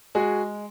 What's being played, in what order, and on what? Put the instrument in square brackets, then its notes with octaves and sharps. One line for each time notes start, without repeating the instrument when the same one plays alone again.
[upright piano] G#3 F#4 G#4